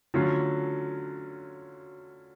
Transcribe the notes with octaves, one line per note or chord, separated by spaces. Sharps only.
D3 F#3 A3 C#4 F4